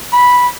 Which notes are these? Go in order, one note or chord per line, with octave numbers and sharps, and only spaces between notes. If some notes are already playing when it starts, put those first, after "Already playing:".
B5